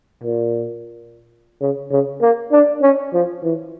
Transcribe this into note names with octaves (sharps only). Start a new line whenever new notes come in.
A#2
C#3
C#3
A#3
D4
C#4
F3
E3